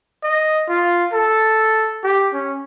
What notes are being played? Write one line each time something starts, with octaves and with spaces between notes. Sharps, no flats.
D#5
F4
A4
G4
C#4